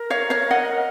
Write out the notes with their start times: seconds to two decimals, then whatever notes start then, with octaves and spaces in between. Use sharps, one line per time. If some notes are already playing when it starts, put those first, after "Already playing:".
Already playing: A#4
0.10 C#5 F5
0.30 C#5 F5
0.51 D#5 F#5